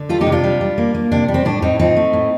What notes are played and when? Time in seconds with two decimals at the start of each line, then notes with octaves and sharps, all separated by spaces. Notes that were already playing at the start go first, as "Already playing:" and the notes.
Already playing: D3
0.09 G3 F4 A4
0.21 D#4 G4
0.27 C3
0.32 D4 F4
0.44 G3
0.61 G3
0.78 A#3
0.95 A#3
1.12 C3 D4
1.28 G3
1.34 C4
1.45 A2 D4
1.62 A2 C4 D#4
1.79 F3 C4 D#4
1.97 A3
2.13 A2